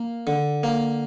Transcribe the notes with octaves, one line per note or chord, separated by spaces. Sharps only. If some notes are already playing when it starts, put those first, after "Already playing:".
Already playing: A#3
D3
A#3